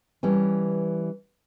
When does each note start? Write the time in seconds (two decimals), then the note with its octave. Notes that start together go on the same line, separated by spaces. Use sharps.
0.23 E3 G3 C#4